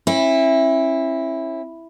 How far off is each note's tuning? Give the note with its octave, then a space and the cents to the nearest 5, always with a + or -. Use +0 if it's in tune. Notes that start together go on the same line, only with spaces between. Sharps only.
C#4 -45 E4 +0